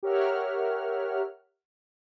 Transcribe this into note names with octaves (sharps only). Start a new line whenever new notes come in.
G4 A#4 C#5 E5 F#5 F6